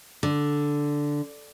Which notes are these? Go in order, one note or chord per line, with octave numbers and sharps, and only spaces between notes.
D3